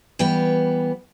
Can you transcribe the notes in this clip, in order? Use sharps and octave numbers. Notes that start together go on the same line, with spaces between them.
E3 G3 B3 G5